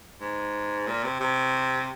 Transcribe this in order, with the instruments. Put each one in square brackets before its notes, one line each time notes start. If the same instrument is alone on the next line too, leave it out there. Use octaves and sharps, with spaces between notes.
[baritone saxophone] G#2
A#2
C3
C3